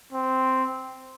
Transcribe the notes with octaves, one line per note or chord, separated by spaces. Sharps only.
C4